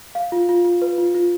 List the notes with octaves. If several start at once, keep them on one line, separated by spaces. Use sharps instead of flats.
F5
F4
F4
F4
B4
F4
F4